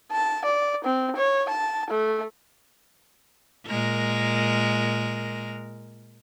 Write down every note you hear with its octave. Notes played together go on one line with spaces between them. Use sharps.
A5
D5
C4
C#5
A5
A3
A#2 G#3 A#4